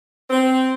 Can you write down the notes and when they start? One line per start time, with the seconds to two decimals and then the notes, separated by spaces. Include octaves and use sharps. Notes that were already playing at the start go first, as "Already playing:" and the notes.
0.30 C4